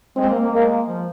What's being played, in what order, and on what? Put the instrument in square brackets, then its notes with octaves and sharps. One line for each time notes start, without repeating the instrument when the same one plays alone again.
[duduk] G#3 [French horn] C4
[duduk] A#3
A#3
[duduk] G#3 [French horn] A#3
[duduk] F3